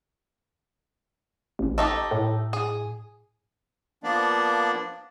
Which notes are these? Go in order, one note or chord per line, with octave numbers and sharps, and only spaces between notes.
A1
A3 D#4 G4
A2
G#4
F3 A#3 B3 D4 D5